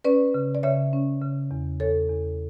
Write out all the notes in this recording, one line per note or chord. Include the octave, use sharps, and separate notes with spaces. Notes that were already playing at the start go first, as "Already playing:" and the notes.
C#4 B4 D5
C#3
D5
C#3 C#5 E5
C#4
C#3
E2
E2 A4 C#5
E2